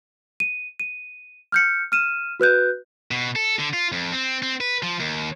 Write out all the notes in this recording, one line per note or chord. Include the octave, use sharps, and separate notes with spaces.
D#7
D#7
F6 G6 C#7
F6 D#7 E7
F#4 B4 F#6 G6
B2
A4
D3
F4
F2
C4
C4
B4
F3
D#2